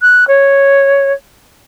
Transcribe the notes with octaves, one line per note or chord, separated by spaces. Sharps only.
F#6
C#5